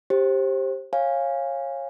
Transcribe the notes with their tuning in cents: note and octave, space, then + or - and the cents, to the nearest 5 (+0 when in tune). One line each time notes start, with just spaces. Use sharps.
G4 +0 C5 +25
C#5 -25 F5 +0 G#5 -20